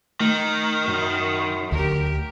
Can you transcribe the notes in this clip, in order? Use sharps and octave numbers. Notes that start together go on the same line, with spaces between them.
D#3 A3
F#2
D2 G4 A#4